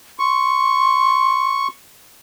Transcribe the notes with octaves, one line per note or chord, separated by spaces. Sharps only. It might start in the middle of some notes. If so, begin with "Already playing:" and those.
C6 C#6